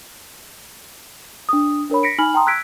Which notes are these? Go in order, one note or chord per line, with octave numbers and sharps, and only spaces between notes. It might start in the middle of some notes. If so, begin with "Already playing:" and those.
D4 D#6
D4 A#4 C#5 B5
A#6 B6 C#7 D7
D#4 G#5 B5 F6 F#7
G5 A5 A#5 C6 D#6
E6 F#6 G#6 B6 D7